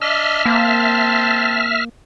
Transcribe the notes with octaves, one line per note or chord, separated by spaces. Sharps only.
D4 D#5 E5 F6
A#3 C4 A5